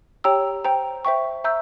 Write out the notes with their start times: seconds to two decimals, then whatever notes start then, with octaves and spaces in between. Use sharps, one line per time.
0.24 G4 C#5 G5 A#5 E6
0.64 C5 G5 A#5
1.05 C5 E5 G5 C#6
1.44 E5 A#5 E6 G6